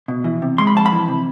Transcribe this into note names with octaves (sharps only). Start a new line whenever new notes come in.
B2
E3
C3
G#3 C6
B5
F2 A5
B5
E3
C3